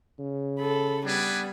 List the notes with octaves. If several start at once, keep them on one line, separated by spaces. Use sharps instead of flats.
C#3
A4 B5
G3 B3 D4 B4 G#5